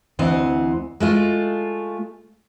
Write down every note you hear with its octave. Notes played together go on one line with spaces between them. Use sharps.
D2 E3 C4 D#5 F#5
G#3 A3 F4